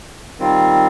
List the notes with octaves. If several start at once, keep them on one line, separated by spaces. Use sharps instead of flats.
D#3 G3 C4 F4